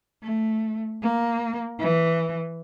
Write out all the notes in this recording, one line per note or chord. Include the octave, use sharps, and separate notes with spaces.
A3
A#3
E3